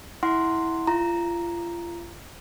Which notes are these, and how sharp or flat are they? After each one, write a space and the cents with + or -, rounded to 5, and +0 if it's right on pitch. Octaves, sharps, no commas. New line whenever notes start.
E4 -10 F#5 +0 C6 +0
F4 -30 A#5 +0